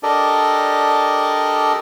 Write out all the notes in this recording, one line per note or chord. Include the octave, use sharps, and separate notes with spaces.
D4 G4 A4 A#4 D5 D#5